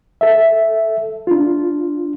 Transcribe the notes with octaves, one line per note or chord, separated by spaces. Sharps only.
A4 E5
D4 F4